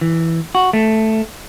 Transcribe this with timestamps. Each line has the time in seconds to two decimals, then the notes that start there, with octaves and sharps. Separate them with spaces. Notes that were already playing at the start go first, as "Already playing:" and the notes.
0.01 E3
0.55 F#4
0.73 A3